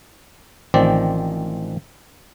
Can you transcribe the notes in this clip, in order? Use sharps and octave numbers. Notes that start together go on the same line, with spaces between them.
A1 D#3 F3 C4 D5